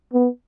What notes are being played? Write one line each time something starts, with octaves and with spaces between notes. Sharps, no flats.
B3